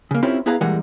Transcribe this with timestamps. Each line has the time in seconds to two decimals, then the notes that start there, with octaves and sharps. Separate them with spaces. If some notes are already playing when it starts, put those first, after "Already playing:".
0.11 C#3 A#3
0.23 C4 C#4 E4 F4 G4 A#4
0.46 B3 E4 G#4 B4 F5 A#5
0.61 A#2 E3 G3 G#3 A#4 F#5